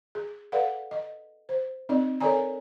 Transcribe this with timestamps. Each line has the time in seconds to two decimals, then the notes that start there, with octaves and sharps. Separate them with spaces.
0.15 G#4
0.52 A4 B4 D5 F5 F#5
0.91 D#5
1.49 C5
1.89 C4 D#4 D5 D#5
2.21 A4 A#4 C#5 D5 G#5 A#5